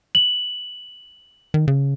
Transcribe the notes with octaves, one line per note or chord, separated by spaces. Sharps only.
F#7
D#3
C#3